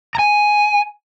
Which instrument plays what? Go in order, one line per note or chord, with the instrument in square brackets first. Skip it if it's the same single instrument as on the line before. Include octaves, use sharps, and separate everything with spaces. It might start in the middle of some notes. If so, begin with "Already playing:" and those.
[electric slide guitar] G#5 A#5